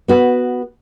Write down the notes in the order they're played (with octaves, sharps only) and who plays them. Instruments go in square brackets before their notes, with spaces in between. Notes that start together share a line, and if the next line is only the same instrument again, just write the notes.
[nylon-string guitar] B3 F#4 B4